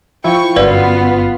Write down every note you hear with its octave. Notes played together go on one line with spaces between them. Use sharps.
F3 E4 G5 C#6
G1 F#2 B3 F4 B4 D5 F5